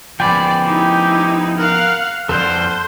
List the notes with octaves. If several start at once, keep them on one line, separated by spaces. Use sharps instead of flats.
F3 B3 D5 G5 G#5 B5
D#4 E4 G4
A#4 F5 F#5
F2 A4 C5 D5 F#5 F6